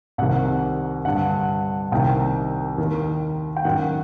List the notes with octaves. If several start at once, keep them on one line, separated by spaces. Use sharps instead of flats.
C2 C3 D#3 F#5
G2 D3 F#5
C2 C3 D#3 G5
D#2 D#3
G5
F#2 D#3 F#5